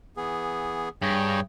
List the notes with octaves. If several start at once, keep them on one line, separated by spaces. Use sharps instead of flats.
E3 B3 G#4
G2 G#4 C#5 G5